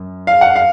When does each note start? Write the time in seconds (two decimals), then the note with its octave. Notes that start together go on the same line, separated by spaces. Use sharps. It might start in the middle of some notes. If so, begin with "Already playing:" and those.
Already playing: F#2
0.27 F5
0.41 F#5
0.56 F5